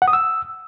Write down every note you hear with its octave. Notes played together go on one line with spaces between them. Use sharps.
F#5
D#6
E6